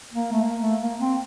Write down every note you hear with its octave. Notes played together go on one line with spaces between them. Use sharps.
A#3
A3
A#3
A3
A#3
C4